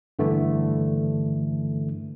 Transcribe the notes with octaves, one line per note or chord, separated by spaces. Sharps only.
G2 D3 E3 A3